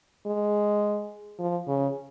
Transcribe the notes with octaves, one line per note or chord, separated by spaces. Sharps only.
G#3
F3
C#3